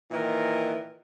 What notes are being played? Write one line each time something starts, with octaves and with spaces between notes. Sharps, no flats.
A#2 D#3 E3 A#4